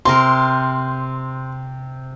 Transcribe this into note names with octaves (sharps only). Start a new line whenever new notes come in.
C3 A#4 C6